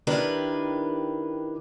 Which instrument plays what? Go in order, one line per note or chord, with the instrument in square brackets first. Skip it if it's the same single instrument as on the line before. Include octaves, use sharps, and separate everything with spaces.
[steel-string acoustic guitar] D#3 D4 E4 G4 A#4 B4